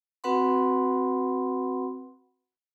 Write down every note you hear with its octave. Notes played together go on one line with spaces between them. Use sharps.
C4 F#4 B4 F#5 B5 C6